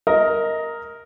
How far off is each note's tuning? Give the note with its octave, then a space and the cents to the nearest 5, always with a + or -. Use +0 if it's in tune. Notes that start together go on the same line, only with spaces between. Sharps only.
A#4 +0 D#5 +15